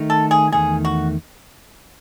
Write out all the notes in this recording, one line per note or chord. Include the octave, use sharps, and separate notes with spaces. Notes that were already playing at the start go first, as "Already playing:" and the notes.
Already playing: D#3 A3 D#4
A4
G#4
E2 D#3 A3 G#4
F#4